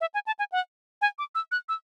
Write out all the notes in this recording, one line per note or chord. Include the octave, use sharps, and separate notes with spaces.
E5
G#5
A5
G#5
F#5
G#5
D6
E6
F#6
E6